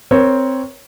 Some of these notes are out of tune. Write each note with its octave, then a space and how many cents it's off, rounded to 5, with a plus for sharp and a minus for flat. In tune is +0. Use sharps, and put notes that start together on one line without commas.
C4 +0 A#4 +30 C#5 +0